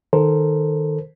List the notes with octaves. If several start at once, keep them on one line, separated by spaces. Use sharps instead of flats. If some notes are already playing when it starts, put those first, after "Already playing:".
D#3 A4 A#4 C5